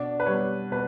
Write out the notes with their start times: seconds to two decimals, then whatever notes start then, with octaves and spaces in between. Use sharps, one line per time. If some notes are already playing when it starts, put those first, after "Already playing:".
Already playing: B2 D4
0.20 B4
0.26 G3 B3 C#5
0.71 B2 B4